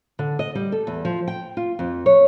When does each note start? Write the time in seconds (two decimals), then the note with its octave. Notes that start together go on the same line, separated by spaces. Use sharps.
0.19 D3
0.39 D#5
0.55 G3
0.72 A4
0.87 E2
1.05 F3
1.28 G5
1.57 F4
1.79 F2
2.06 C#5